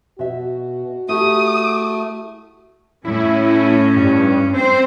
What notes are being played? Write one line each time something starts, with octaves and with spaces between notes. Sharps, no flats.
B2 F#4 E5
A3 E4 G4 G#4 D#6
A2 C#4 E4
G2
C4 C5